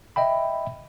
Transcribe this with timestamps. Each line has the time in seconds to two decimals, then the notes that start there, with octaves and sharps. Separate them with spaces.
0.16 D#5 E5 G5 B5